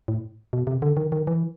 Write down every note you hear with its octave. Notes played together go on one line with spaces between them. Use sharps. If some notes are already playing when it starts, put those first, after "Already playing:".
A2
B2
C3
D3
D#3
D#3
E3